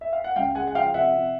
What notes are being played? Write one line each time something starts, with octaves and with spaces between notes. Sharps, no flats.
E5
F5
F#5
C#2 F5 G5
G#3 F#5 G#5
F#5
F3 F5 G5
C3 E5 F#5
C3